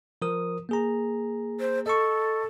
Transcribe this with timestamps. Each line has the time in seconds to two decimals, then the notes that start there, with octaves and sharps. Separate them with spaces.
0.22 F3 A#4 D#6
0.69 A#3 G#4 A#5
1.60 C5
1.86 A4 D#5 C#6